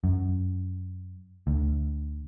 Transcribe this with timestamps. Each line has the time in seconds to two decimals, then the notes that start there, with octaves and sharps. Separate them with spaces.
0.04 F#2
1.47 D2